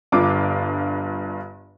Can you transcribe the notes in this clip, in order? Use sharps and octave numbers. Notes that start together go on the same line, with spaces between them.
G1 G2 F4 D6